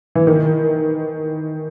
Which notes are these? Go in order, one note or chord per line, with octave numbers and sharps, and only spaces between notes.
E3
D#3